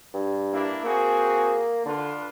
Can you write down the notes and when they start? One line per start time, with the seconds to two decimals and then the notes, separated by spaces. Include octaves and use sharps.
0.14 G2
0.52 A#3 D4 E4
0.84 A#3 C4 F#4 G#4
1.85 D3 D4 F4 B4